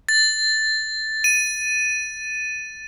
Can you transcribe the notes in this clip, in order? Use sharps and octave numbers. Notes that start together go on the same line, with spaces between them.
A6
D#7